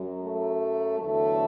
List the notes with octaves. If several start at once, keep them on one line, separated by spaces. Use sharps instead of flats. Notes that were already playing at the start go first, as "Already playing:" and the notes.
Already playing: F#2 F#3
A3
E2 D3 F#3 A3